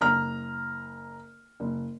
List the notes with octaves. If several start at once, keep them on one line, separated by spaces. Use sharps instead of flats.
F#1 A#5 F6
F#1